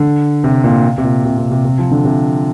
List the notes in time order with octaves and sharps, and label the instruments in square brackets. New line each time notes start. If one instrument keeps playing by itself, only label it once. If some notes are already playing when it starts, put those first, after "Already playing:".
Already playing: [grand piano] D3
C3
A#2
C3
A#2
C3
C3
C3
C3
F3
D3
C3